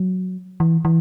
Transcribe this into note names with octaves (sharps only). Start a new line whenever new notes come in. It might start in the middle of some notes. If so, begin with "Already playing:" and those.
Already playing: F#3
E3
E3